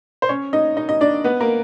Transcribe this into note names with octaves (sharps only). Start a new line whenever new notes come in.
C5
C#4 C#5
D#4 D#5
D#4 D#5
D#4 D#5
D4 D5
B3 B4
A#3 A#4